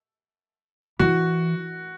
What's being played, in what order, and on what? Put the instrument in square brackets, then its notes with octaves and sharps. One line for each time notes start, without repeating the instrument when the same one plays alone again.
[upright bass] E3 [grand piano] F#4